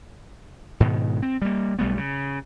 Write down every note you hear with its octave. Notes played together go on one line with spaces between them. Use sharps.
G#2 B2 D#3
C4
G3 A#3
B1 G3 A3 B3
C#3